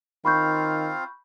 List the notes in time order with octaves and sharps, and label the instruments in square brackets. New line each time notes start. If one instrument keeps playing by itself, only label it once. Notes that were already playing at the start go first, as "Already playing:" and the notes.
[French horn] D#3 [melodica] C4 F4 F5 [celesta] B5 C#6 G6